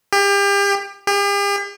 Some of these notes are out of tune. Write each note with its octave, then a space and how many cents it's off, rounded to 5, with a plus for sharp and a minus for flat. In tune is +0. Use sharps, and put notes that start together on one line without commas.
G4 +35
G4 +45